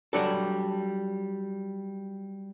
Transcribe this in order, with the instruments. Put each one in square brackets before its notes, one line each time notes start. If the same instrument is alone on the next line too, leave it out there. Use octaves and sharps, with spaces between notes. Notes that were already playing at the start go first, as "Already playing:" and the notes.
[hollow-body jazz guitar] F#3 G3 D4 A4